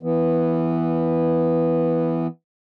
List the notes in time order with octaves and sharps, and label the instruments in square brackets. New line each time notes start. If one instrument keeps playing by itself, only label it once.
[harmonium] E3 B3